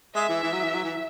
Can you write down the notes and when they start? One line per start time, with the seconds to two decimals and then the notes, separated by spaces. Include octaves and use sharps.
0.15 G#3 E5
0.29 E3
0.43 E3
0.53 F#3
0.64 E3
0.74 F#3
0.84 E3